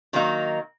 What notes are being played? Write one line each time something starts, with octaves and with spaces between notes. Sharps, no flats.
D#3 F#3 A#3 D#4